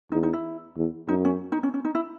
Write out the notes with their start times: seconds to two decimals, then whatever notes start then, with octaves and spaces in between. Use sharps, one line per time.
0.12 E2 D#4
0.23 D#4
0.33 E4
0.77 E2
1.08 F#2 D#4
1.25 C#4
1.52 D#4
1.63 C#4
1.74 C#4
1.85 D#4
1.95 E4